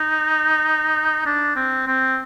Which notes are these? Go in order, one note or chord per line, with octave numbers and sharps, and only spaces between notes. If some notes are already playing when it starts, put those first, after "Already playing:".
Already playing: D#4
D4
C4
C4